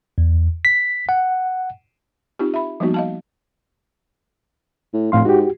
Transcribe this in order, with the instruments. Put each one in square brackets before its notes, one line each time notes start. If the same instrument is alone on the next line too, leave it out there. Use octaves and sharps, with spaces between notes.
[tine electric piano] E2
B6
F#5
[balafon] C4 D#4 F4 G4
E5 B5
F3 G3 A#3 B3 D#4 F#4
D#5 F5 A5
[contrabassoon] A2
[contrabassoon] F1 [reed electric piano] A2 F5 C6
[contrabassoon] G#2 [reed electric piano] F#4 G4